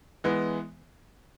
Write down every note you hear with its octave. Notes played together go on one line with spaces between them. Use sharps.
E3 G#3 B3